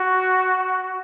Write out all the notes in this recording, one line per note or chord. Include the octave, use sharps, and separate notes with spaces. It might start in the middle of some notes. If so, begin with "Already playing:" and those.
Already playing: F#4